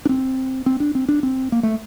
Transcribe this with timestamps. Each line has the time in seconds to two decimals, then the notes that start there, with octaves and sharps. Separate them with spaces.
0.05 D4
0.09 C4
0.66 C4
0.80 D4
0.95 C4
1.09 D4
1.23 C4
1.52 A#3
1.63 A3